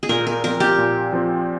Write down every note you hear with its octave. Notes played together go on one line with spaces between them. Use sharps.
G#4
A#2 A#4
A#4
F3 C4 A#4
G4
A#2
F3 C4